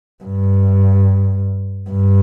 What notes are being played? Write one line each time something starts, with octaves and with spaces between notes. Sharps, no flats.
G2
G2